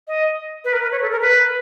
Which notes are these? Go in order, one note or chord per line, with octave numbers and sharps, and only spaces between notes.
D#5
B4
A#4
B4
C#5
A4
A#4
B4